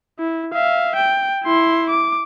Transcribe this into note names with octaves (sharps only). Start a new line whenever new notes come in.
E4
E5 F5
G5
E4 C6
D6